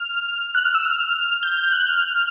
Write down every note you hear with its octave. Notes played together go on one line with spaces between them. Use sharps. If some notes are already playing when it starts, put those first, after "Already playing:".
Already playing: F6
F#6
F6
E6
F6
G6
G6
F#6
F6